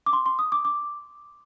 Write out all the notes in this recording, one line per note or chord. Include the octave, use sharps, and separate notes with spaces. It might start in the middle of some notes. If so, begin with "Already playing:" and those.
D6
C6
C6
D#6
D6
D6